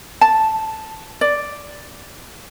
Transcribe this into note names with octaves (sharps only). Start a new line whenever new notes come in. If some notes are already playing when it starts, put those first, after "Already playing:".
A5
D5